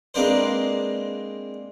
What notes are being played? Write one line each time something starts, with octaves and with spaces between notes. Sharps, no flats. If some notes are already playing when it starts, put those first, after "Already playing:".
G#3 A#3 C4 D4 B4 C5